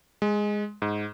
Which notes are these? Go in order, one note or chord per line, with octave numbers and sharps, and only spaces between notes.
G#3
G#2